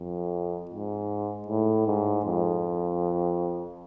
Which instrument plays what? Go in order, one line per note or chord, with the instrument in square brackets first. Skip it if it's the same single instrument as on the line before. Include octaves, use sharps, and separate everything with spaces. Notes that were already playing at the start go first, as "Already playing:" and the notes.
Already playing: [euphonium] F2
G#2
A2
G#2
F2